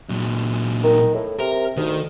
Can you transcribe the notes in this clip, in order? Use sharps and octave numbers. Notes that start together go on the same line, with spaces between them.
A#2 F#3
D#3
A2
C3 A#4
D2 D#3